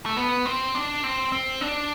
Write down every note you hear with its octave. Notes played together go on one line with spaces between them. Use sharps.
A3
B3
C4
D4
C4
C4
D4